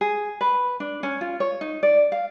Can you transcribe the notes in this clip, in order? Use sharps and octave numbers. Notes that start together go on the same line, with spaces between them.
G#4
B4
D4
C#4
F4
C#5
D#4
D5
F5